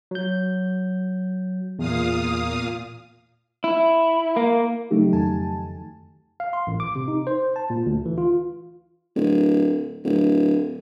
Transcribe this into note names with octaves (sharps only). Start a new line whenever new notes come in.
F#3 G6
E2 A#2 F5 D#6
E4
A#3
C#3 F#3 A3 D#4 G4
F2 D#3 G#5 A5
F5
C6
A1
D6
C3
D#4
C5
A5
A#2
D2
E3
F4
D1
D1